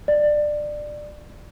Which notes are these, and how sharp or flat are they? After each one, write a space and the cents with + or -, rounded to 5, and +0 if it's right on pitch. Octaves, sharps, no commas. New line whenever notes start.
D5 +20